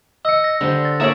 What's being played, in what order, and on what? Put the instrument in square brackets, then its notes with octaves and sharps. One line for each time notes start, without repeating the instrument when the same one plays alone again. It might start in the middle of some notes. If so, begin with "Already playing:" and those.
[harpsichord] D#5 [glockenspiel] E6 C#7
[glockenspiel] A#6
[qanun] D3 C5 C6 [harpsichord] G3
[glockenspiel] A6
[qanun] A#3 C#5 D5 [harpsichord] G#4 E5 [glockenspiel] E7